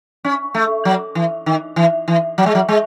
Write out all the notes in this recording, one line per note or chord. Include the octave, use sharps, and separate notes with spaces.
C#4
A3
F#3
E3
D#3
E3
E3
F#3
G#3
F#3
G#3